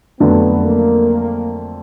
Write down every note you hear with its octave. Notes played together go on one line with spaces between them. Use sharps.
F2 D3 F#3 A3 B3 D4
A#3